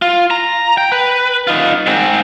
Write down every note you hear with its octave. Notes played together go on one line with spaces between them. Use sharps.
F4
A#5
G5
B4
D#4 F4
G#2 C4